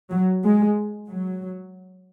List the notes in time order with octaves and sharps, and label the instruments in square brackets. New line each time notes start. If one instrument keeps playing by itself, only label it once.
[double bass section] F#3
G#3
F#3